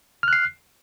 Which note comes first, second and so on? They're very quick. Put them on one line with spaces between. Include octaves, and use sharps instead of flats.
F6 F#6 C7